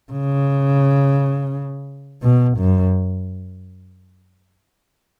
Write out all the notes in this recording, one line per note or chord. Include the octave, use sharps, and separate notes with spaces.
C#3
B2
F#2